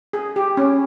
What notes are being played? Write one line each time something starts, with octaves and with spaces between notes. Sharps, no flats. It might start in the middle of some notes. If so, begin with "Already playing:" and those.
G#4
G4
C#4